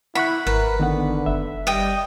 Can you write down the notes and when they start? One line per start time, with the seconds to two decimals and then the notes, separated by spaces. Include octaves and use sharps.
0.15 E4 F#5 B5 C#6 F#6
0.47 G#1 A#4 B4
0.79 D3 D#3 B3 F#5
1.26 F#1 E5
1.67 G3 D#5 G5